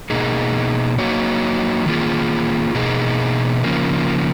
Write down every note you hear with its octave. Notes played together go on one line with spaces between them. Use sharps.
B2 A#3 D#4 G#4
F#3 A#3 D#4 F#4 C#5
D#3 F#3 A#3 F4 G#4
B2 A#3 D#4 G#4
C#3 F3 A#3